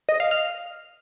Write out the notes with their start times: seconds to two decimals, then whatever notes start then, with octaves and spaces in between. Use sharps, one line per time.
0.09 D#5
0.20 F5
0.31 F6